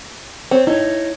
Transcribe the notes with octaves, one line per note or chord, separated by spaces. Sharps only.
C4 C#5
D#4 E4 C#5